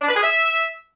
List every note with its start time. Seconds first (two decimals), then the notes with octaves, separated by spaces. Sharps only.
0.02 D4
0.09 B4
0.16 G#4
0.23 E5